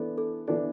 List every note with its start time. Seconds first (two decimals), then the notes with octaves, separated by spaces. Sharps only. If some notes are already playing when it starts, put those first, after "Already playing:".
Already playing: E3 B3 D4 A4
0.18 A4
0.48 E3 B3 D4 A4